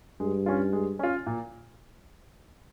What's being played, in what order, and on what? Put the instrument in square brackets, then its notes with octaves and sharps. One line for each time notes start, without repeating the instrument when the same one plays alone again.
[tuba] G2 [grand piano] G#3
[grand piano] C#4 F4
G#3
C#4 F4
A#2